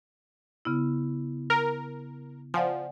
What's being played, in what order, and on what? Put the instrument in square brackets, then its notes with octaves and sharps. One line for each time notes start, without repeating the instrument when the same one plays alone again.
[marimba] C#3 B3 E4
[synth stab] A#4
[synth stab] F3 [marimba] D5 F#5 G#5